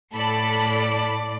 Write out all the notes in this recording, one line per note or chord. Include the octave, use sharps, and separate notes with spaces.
A2 A4 D5 B5